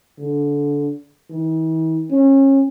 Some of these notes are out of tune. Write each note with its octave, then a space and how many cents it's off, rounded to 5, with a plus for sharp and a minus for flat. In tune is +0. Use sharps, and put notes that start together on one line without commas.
D3 -20
E3 -45
C#4 -30